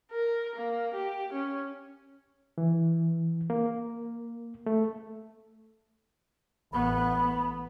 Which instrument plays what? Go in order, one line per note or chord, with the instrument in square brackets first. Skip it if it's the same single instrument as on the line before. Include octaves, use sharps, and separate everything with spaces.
[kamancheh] A#4
A#3
G4
C#4
[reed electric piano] E3
A#3
A3
[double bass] A1 B3 [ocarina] B5